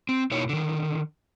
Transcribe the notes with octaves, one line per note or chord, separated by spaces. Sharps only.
C4
B2 A#3 D#4 E4 C#5
D3 D#3